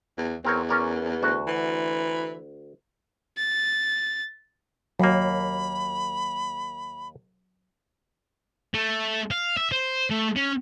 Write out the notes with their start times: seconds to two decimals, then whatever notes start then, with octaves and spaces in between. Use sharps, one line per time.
0.18 E2
0.45 E2 C4 A#4 C#5
0.69 C#4 A#4 D5
1.23 D2 F#4
1.47 E3
3.37 A6
5.00 D#2 F#3 A#3 B5
8.74 A3
9.31 F5
9.57 E5
9.72 C5
10.11 A3
10.36 C#4